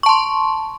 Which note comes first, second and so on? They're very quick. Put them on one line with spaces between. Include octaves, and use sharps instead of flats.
C#6 A5 C6